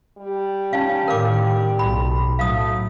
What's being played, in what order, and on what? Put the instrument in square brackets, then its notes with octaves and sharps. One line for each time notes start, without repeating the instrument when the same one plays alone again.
[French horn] G3
[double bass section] C#4 [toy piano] D#4 F5
[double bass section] A2 D#3 [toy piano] A#4 F5 D6
[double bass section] B1 [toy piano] B5
[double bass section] A2 F#3 [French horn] A3 [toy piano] F5 D#6